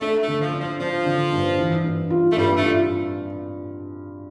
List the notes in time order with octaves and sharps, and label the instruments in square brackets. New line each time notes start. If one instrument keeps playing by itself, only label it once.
[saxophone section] A3 [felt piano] D4
[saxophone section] A3
[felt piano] D3
[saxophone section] F3
[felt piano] D4
[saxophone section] F3
[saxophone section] F3 [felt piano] D4
[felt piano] D3
G2
E3
G2
F4
[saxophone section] A3
[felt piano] G2 [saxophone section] G3
[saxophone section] A3
[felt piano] F4